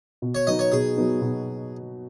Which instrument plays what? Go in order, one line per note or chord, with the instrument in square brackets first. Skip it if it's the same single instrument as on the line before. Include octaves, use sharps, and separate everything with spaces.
[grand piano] B2
[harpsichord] C#5
[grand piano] F#3 B3 D#4 [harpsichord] D#5
[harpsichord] C#5
[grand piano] B2 [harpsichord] G#4
[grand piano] F#3 B3 D#4
B2